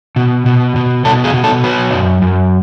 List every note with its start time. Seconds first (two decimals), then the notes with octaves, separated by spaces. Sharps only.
0.16 B2
0.46 B2
0.76 B2
1.05 B2 A4
1.24 G#4
1.34 B2
1.44 A4
1.64 F#3 B4
1.93 F#2
2.22 F#2